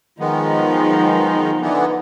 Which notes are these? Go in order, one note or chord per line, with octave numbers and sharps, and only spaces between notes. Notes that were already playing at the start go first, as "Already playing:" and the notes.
D#3 F3 G#3 B3 D#4
D3 E3 B3